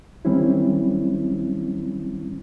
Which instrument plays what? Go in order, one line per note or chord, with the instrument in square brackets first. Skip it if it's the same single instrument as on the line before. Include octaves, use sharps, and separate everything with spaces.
[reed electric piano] D#3 F#3 G3 C4 C#4 E4